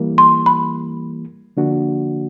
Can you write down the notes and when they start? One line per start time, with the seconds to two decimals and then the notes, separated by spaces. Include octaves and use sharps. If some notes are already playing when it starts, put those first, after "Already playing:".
Already playing: E3 G3 A#3
0.18 C6
0.46 B5
1.57 D3 F3 A#3 D4 F#4